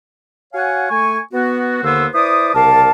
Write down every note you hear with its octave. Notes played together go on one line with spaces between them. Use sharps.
F#4 C#5 F5 F#5 G#5
A3 G#5 C#6
B3 F#4
D#2 D3 A#3 B3 C5 E6
E4 B4 C5 D5 D#6
C2 C#3 A#4 D5 F5 A5